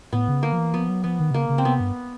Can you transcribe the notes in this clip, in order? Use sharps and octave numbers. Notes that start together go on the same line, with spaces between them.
A2 B3
C#3
D3 A#3
F3
E3
F3 B3
F#3
F3 B3
D#3
C3
C#3 A#3
C#3
C4
C3 B3
G2